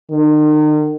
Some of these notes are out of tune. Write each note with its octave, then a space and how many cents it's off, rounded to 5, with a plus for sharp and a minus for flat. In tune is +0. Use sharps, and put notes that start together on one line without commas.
D#3 -40